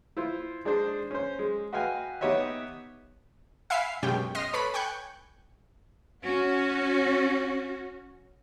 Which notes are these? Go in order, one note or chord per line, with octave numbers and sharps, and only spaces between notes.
E4 F4 C5
G#3 D4 G#4 C5
C#4 C5
G#3
F#4 B4 D#5 F5 G5 G#5
B3 D#4 G4 C#5 D#5 E5
E5 F5 G#5 B5 C7
F#2 B2 G#3 C#4 G4 G5
D#5 C6 F6 A#6
A4 B4 C#5 B5 C#6
G5 G#5 C#6 F#6 G6
C#4 F#4